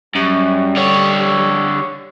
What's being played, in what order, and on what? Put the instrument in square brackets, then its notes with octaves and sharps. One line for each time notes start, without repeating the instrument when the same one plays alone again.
[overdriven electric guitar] F#2 [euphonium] G3
[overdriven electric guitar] D3 C#5